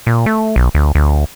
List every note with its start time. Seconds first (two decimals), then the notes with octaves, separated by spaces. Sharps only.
0.07 A#2
0.26 A3
0.56 B1
0.75 D2
0.95 D2